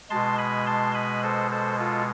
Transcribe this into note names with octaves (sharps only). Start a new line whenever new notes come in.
B2 G#3 A5 C6
G#5 B5
A5 C6
G#5 B5
A4 C5
A4 C5
F4 A4